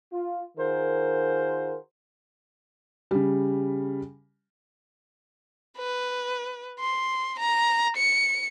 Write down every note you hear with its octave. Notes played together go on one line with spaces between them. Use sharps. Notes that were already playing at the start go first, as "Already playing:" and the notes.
F4
D#3 F4 F#4 G#4 A#4 C5
C#3 G3
B4
C6
A#5
C#7